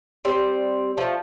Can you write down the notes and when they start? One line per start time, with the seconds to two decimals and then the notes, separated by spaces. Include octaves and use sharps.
0.25 G3 C4
0.97 F3 A3